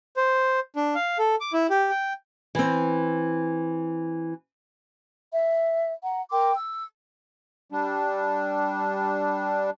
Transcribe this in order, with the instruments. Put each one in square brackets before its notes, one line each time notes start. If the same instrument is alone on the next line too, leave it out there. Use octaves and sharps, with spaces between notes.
[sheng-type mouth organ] C5
D4
F5
A4
D6
E4
G4
G5
[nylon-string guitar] E3 C4
[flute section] E5
F#5 A#5
A#4 G5 C6 D6
E6
[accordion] G3 D4